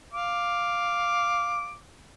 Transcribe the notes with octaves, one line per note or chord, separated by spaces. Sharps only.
F5 D6